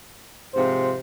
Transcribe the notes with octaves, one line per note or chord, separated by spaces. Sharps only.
G#2 C3 F3 C5